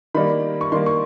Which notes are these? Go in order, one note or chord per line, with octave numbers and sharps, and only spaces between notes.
D#3 G3 A#3 B5
C#6
D#3 G3 A#3 C6
C#6